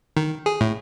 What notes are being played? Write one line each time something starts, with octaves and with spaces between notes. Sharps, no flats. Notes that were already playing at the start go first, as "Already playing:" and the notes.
D#3
G#4
A2